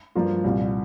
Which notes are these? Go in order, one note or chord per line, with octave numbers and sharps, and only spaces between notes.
G2 F3 A#3 F4
C2 A#2 G3